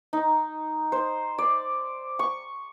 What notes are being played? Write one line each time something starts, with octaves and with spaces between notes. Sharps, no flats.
D#4
C5
D5
C#6